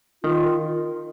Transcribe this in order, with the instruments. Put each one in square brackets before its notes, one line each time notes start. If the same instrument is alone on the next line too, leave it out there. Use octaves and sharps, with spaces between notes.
[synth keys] D#3 [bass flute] F4